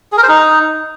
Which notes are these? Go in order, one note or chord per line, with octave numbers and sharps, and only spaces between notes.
G#4
A#4
C5
D#4